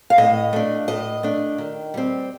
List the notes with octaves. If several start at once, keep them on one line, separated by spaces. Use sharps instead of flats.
F5
A2 D#5
A3 D4
A2 D#5
A3 D4
D#3
G3 C4